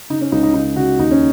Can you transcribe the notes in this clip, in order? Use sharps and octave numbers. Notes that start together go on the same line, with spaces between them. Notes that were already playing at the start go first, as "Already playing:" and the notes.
C#3 D#4
C#4
C#2 D#4
D#4
C#3 D#4
C#3 F#4
D#2 D#4
C#4